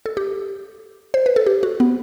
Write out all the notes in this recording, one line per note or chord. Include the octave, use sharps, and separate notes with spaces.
A4
G4
C5
B4
A4
G4
F#4
B3